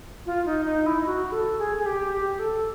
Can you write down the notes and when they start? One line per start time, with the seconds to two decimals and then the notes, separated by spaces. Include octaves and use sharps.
0.26 F4
0.46 D#4
0.65 D#4
0.86 E4
1.06 F#4
1.32 A4
1.59 G#4
1.78 G#4
1.86 G4
2.13 G4
2.39 A4